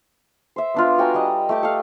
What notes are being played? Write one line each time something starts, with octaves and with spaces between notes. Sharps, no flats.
C5 E5
B3 D4 F4
F#4 G5 G#5 A#5
G3 D#5
A3 G4 A5
A4 F5